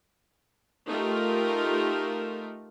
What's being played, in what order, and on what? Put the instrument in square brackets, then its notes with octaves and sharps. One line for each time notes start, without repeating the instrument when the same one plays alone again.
[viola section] A3 D#4 F4 G4 A#4